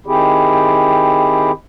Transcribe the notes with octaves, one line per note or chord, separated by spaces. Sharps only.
D#3 C4 E4 G4 G#4